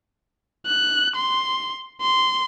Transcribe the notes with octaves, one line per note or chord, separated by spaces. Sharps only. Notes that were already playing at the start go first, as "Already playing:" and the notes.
F#6
C6
C6